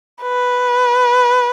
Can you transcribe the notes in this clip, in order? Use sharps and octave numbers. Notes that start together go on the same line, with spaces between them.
B4